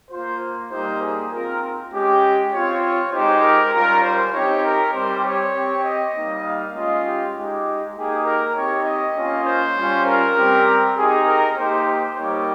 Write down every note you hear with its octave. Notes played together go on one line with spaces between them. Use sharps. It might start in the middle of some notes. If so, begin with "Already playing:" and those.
A#3 F4 C5
G3 A#3 D#4 G4 C5
G#4
C4 F4 A#4
G#3 C#4 G4
C4 F4 C#5
C#5
G#3 D#4 G4 C5
A#4
G3 C#4 F4 A#4
C5
C4 D#4 G4 C#5
A#4
G3 C4 G4 C5
C#5
C4 G4
D#5
G3 A#3 D#4
F5
G#3 C#4 F4 D#5
G4
G#3 D#4 G4
A#3 D#4 G4 G#4
A#4
C4 D#4 G4 C#5
D#5
A#3 C#4 F4
C5
G3 C#4 F4
A#4
G3 C4 G4
C4 D#4 G4 G#4
A#4
A#3 D#4 G4 C5
C5
G3 A#3 D#4 G4 C#5